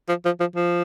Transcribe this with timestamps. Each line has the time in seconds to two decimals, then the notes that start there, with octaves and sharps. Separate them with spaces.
0.08 F3
0.25 F3
0.40 F3
0.56 F3